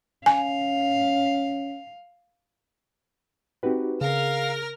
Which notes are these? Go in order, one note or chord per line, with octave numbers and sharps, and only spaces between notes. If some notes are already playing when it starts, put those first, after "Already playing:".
C#4 F5 G#5
C4 D#4 F#4 G4 B4
C#3 G#4 A#4 F5 F6